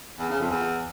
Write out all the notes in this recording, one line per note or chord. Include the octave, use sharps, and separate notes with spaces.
E2
C#3
F2
E2